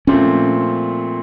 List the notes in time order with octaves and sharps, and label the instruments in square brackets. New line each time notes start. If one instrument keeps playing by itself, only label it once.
[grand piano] A#2 F3 A3 C4 [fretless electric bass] C#4